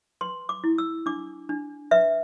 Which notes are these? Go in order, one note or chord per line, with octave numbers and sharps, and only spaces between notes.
B4 C6
D6
E4
E6
D4 D6
D4
B4 E5